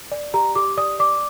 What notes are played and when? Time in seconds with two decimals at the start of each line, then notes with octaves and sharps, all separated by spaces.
0.11 D5
0.34 G4 A#5
0.55 G4 D6
0.77 D5 D#6
0.99 D5 D6